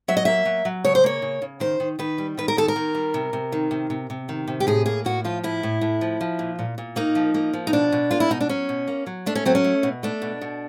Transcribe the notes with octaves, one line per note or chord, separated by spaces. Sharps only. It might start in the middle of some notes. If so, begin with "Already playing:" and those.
F#3 E5
D#5
A#3 E5
F#3
F#3
C#3 C#5
C5
A#3 C#5
C#3
C#3
D#3 C5
D#3
D#3 B4
G3
D#3 B4
A#4
D#3 A4
A#4
D#3
G3
C3
C3
D#3
C3
C3
C3
D#3
C3
G4
A2 G#4
A#3 G#4
A2 F#4
F3 F4
A2 E4
A2
A2
F3
F3
A#2
A#2
A#2
A#3 D#4
F3
A#3
F3
D#4
B2 D4
B2
A#3 F4
E4
B2 D#4
D4
F#3 C#4
B2
A#3
F#3
A3 D4
C#4
F#3 C4
C#4
A3
B2
A3 D4
B2
B2